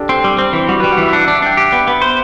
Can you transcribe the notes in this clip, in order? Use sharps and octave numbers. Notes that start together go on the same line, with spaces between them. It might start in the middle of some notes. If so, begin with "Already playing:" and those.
Already playing: D4 G4 A4
C4
G3
C4
E3
G3 F#4
G3 B4
F#5
E3 E5
E5
D4 F#5
E5
D4
E5
D4 G5
G4
B3
B3
C5